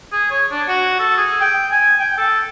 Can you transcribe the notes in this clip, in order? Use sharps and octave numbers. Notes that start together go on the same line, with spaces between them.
G#4
C#5
D4
F#4
A4
G#4
G5
G#5
G5
A4